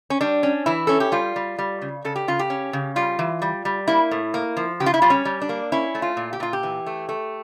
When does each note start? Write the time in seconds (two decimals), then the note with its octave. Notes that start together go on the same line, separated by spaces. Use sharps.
0.10 C#4
0.21 G3 D4
0.43 C#4
0.66 E3 E4
0.87 C#4 A4
1.00 G4
1.12 G3 F4
1.36 G3
1.59 G3
1.82 C#3
2.05 C#3 A4
2.16 G4
2.28 C#3 F4
2.39 G4
2.50 C#4
2.73 C#3
2.96 G3 F4
3.19 E3
3.42 G3
3.65 G3
3.88 A#3 E4
4.11 A2
4.34 A#3
4.57 F3
4.80 C#3 G4
4.86 F4
4.94 E4
5.02 G3 F4
5.10 C#4
5.25 G3
5.42 D4
5.49 A#3
5.72 C#4 E4
5.95 A3
6.02 F4
6.17 A#2
6.33 G4
6.40 A#2 F4
6.53 G4
6.63 E3
6.86 A3
7.09 A3